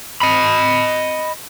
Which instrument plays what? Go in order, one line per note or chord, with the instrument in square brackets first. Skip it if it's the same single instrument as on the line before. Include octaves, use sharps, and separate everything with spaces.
[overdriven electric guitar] D#5 B5